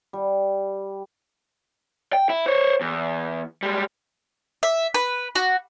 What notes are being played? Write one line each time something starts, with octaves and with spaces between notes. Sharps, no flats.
G3
G5
E4
C5 C#5
E2
G3 G#3
E5
B4
F#4